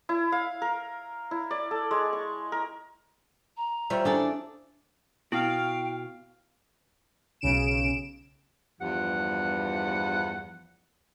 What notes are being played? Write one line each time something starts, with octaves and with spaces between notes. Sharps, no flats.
E4
F5
A#4
E4
D5
A4
G#3
C#6
A#4
A#5
G3 E4 F4 C5 C#5 E5
A3 D4 G#4 A4 D5
B2 E4 F5 G5
B1 C#3 D7 E7
E2 G2 F3 F#5